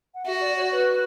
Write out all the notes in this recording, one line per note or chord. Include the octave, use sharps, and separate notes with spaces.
F#5
F#4 E5
D5
C#5
B4